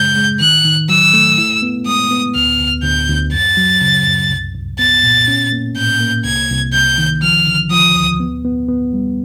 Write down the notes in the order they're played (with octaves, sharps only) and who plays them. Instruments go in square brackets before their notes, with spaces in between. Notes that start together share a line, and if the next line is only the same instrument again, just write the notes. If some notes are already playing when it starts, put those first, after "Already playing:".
Already playing: [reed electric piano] F#2 C#3 G#3 [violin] G6
[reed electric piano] G#3
[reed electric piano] D#3 [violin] F#6
[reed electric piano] D#3
[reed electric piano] F#3 [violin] E6
[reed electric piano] A3
E4
B3
[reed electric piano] G#3 [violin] D#6
[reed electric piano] B3
[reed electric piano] D2 [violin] F6
[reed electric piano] D2
[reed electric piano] D2 [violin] G6
[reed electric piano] D2
[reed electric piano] F#2 [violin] A6
[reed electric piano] F#3
C#3
F#2
C2
C2
[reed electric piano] B3 [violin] A6
[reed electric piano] A#2
C#4
A#3
[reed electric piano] A2 [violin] G6
[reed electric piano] A#3
[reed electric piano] C2 [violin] G#6
[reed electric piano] C2
[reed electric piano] C2 [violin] G6
[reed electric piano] D#3
[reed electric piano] F3 [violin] F6
[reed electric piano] D3
[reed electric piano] F3 [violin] D#6
[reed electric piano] D2
B3
B3
B3
G3